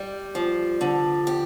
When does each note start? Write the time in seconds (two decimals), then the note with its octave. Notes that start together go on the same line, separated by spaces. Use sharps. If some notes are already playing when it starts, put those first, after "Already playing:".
Already playing: G3
0.35 F3
0.81 D3
1.27 G4